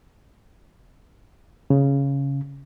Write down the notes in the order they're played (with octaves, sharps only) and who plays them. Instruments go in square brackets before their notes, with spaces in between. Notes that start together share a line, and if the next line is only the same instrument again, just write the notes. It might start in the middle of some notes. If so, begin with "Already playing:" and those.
[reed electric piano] C#3